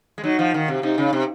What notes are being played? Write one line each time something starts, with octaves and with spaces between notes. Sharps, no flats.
G#3
F#3 D#4
F3
D#3
C3
C3 D#4
C#3
C3